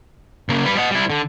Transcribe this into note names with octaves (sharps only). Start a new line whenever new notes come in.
C#3 A#3
G3 B4
D#5 F#5
G3 E4
D3